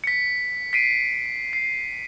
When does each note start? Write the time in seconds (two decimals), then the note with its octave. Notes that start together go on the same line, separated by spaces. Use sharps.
0.04 B6 C#7
0.73 B6 C7 D7 D#7
1.53 C7